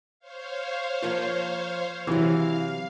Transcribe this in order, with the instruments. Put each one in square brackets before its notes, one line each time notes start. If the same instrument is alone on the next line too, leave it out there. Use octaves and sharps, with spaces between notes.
[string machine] C5 C#5 F5
[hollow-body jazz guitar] F3 A#3 F4
[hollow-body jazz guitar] C3 F#3 [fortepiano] E3 [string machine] F5